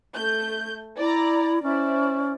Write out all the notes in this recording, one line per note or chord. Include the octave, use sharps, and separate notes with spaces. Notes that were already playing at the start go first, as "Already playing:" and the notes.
A3 G6
E4 D5 A#5
C#4 E4 C5 D5